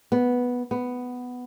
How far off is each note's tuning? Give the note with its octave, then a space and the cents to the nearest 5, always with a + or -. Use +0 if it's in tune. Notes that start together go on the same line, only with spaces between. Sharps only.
B3 -5
B3 +5